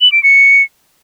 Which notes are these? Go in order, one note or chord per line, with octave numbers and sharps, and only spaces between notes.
F#7
D7
C#7